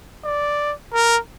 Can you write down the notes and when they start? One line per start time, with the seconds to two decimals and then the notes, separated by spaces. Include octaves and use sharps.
0.24 D5
0.93 A#4